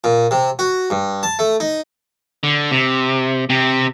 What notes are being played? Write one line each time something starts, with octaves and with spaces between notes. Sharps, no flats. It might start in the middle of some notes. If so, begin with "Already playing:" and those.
A#2
C3
F#4
G2
A5
A3
D#4
D3
C3
C3 C4